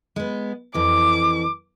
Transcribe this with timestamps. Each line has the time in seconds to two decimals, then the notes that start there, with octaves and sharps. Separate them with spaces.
0.16 G#3 B3
0.74 F2 E3 D6